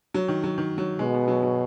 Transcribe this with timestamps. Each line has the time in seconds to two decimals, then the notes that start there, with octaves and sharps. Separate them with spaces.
0.14 F#3
0.28 D#3
0.44 F#3
0.58 D#3
0.78 F#3
0.99 B2 G#3
1.14 B3
1.28 F#3
1.43 F#3